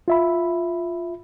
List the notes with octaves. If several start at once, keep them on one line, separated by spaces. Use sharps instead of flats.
F4 E5 B5